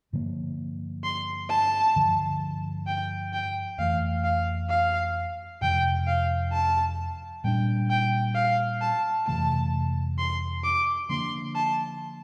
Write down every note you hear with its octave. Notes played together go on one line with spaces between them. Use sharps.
G2 D3 F3 A#3
C6
A5
G2 D3 F3
G5
G5
F2 E3 A3 F5
F5
F5
F2 C3 F3 G5
F5
A5
A#2 G3 A#3 D4 G5
G5
F5
A5
F2 C3 E3 A3 A5
C6
D6
D3 F3 A#3 D4 C6
A5